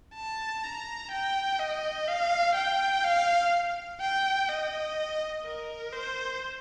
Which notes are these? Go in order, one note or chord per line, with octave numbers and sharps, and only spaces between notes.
A5
A#5
G5
D#5
F5
G5
F5
G5
D#5
A#4
C5